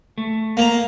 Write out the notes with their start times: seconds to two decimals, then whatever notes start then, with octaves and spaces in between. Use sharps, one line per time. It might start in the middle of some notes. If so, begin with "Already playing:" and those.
0.18 A3
0.57 A#3 A#5